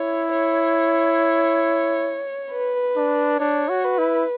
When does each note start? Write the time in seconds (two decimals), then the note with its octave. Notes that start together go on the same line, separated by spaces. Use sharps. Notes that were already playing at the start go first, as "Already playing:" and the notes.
Already playing: E4 C#5
0.33 C#5
2.52 B4
2.96 D4
3.40 D4 C#5
3.69 F#4
3.84 B4
3.98 E4